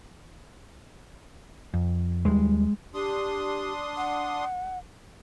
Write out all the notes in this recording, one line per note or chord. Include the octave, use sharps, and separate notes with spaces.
F2
D#2 G3 G#3
D4 G4 C6 D#6
F#5